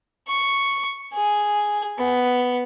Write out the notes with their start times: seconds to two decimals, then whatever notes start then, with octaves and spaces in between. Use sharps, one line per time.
0.28 C#6
1.14 G#4
1.99 B3